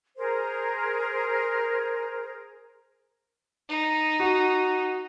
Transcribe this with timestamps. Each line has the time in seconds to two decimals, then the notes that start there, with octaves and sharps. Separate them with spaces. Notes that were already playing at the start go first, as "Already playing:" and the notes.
0.17 G#4 A#4 C5
3.69 D#4
4.20 F#4